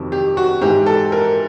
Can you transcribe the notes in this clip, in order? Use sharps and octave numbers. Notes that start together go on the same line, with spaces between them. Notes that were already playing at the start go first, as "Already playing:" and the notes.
Already playing: F2 C3 D#3 F#3
G4
F#4
G#2 E3 G4
A4
A#4